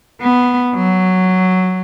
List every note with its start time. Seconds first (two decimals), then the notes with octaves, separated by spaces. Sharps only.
0.21 B3
0.76 F#3